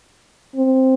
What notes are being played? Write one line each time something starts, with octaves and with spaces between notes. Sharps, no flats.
C4